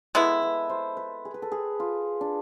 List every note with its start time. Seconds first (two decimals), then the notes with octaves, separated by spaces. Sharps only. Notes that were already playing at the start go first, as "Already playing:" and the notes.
0.15 G#3 B3 E4 A4
0.42 B4
0.69 C5
0.97 B4
1.25 G#4
1.34 B4
1.42 A4
1.52 G#4
1.80 F4
2.21 D4